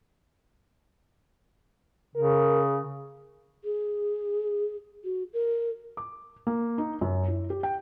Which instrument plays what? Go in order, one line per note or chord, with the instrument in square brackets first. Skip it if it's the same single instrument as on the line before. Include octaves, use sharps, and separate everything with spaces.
[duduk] C#3 [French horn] A#4
[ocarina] G#4
F#4
A#4
[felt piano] D6
A#3
D#4
F#2
E4
G4
G5